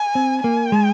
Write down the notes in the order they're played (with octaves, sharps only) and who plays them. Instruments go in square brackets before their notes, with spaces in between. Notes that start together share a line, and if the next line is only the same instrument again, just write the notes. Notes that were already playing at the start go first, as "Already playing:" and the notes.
Already playing: [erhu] G#5
[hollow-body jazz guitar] C4
[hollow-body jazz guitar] A#3 [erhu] G#5
[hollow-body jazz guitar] G#3